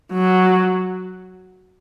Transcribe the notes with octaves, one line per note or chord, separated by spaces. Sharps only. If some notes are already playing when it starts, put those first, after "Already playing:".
F#3